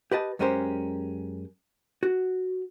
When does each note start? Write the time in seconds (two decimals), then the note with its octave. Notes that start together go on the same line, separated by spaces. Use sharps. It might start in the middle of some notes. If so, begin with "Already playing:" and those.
0.11 G4 B4 D#5 A5
0.39 F#2 G#3 C#4 G4 A#4 C5
2.03 F#4